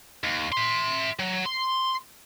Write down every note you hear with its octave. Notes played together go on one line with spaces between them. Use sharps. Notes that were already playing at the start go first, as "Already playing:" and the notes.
D#2
E5 C6
F#3
C6